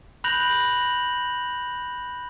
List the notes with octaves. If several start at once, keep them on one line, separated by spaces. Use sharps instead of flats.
B5 F#6 G6 A#6 F7 F#7